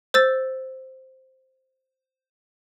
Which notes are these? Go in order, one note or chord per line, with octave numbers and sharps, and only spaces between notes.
C5 E6 A6